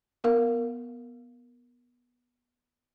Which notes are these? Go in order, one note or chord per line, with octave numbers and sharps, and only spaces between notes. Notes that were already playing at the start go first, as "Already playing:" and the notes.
B3 A#4 F5